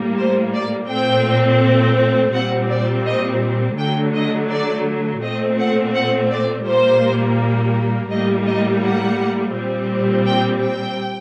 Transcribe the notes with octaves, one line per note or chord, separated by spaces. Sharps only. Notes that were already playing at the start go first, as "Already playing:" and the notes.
Already playing: A2 G3 A#3
C5
D5
A#2 A3 C4 G5
A#2 G3 C4 F#5
D5
D#5
D3 F#3 A3 G5
D#5
D5
A#2 A3 C4 D#5
F#5
F#5
D5
A#2 G3 A#3 C5
A2 G3 A#3 D#5
D#5
F#5
A#2 G3 C4
G5
G5